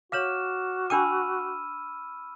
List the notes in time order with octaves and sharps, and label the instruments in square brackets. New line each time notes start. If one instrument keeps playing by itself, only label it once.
[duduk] F#4 [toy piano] C#5 F5 [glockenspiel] D6 F6 E7
[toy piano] D4 G5 D6 [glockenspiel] B5 E6 D#7